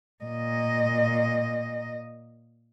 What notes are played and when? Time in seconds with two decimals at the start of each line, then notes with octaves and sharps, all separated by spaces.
0.24 A#2 D#5